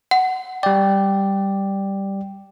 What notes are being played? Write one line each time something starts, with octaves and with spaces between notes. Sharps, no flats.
F#5
G3 D5 G5